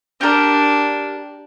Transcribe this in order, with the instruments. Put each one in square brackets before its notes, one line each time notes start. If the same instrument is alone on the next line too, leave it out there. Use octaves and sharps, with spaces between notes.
[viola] D4 [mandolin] G4 A#4